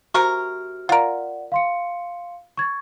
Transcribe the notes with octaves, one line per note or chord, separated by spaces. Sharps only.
C3 F#4 A#4 C#6
F4 A#4 D5 F#5
F5 C6 C#7
C#6 G#6 A6